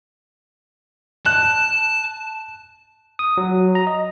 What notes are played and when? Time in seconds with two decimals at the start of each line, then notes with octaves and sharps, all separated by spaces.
1.26 A5 F#6
3.19 D#6
3.37 F#3
3.75 A#5
3.87 D#5